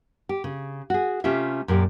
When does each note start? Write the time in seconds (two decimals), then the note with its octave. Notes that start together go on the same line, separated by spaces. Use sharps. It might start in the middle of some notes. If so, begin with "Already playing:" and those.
0.29 G4
0.44 C#3
0.90 F#4 G#4
1.24 C3 A3 C#4 F4 G4 E5
1.68 F#2 A#2 G4